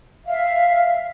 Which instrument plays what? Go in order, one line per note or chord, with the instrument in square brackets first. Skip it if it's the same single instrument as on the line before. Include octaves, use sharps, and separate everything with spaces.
[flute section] E5 F5